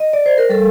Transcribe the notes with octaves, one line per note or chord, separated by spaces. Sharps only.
D#5
D5
C5
A#4
G3 A4